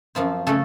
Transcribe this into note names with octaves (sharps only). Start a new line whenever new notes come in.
F#2 F3 C4 F4
C#3 A3 C#4 A4